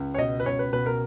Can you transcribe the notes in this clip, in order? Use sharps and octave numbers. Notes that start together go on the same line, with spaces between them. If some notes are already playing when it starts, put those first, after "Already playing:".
Already playing: C#2
C#5
B2 D#5
B4
C#2 C#5
B4
B2 B4
A#4